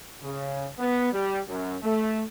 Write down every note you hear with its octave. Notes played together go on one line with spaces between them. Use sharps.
C#3
B3
G3
F#2
A3